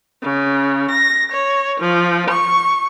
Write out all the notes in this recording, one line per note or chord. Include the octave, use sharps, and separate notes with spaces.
C#3
A#6
C#5
F3
C#6